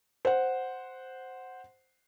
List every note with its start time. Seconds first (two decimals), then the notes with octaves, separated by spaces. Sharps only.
0.25 C5 F#5